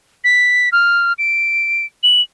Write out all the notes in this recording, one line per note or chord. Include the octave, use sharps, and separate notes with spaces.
B6
F6
D7
F#7